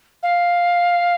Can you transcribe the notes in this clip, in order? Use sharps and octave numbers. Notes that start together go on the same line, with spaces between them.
F5